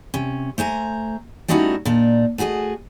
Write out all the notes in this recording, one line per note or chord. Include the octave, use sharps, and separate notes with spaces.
C3 C#4
A3 C5 G#5 A#5
G3 A3 C#4 D#4 E4 F#4
A#2 D4 D#4
A3 F#4 G#4 C#5 D#5